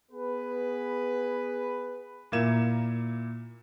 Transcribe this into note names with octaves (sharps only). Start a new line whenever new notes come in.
B3 G#4 B4
A#2 A#3 E4 G#6 E7